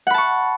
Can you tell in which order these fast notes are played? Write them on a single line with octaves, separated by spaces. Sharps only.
F#5 B5 A5 C#6